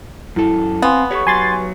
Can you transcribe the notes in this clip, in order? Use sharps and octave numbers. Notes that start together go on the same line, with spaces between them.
F#2 E4 A4
B3 C4 F5 G#5 C6
G4 A4 B4 C#5 C#6
F#3 B4 G#5 C6 A6